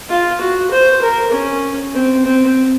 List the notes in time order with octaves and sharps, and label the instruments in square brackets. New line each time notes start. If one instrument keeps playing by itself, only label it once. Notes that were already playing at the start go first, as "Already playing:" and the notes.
[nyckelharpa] F4
F#4
C5
A#4
C#4
C4
C4